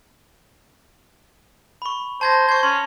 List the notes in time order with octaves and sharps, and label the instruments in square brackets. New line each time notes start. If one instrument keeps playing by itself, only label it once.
[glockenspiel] B5 C#6
[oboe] C5 [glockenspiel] A5 G#6 A#6
[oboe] C5 [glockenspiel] C#6 G#6
[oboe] C#4 [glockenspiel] C6